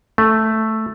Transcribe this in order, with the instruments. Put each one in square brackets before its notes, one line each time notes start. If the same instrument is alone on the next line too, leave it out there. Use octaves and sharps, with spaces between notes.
[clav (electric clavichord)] A3